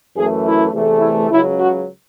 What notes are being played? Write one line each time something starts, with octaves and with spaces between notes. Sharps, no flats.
F#2 E3 A3 G#4
E4
E2 C3 E3 A3
E4
C#2 C#3 F#3 E4
F#4